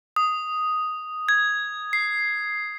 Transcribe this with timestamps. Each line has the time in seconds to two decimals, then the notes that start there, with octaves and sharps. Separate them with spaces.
0.16 D#6
1.29 G#6
1.93 C7